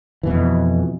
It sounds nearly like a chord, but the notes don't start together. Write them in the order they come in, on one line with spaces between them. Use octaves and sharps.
E3 B2 F2